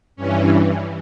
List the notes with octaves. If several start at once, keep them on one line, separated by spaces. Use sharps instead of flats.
G2 E3 C#4